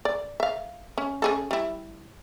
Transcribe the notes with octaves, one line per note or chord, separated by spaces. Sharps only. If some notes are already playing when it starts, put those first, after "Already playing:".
D5
E5 F5
C#4
C#4 G#4 A4
G3 E4